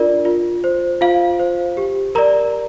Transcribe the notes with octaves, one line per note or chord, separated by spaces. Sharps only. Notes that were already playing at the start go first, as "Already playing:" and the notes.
Already playing: D4 F4 A#4 D5
F4
C5
F4 F5
C5
G4
A#4 D5 A#5